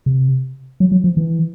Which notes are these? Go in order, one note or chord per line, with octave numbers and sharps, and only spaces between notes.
C3
F#3
F#3
F3
E3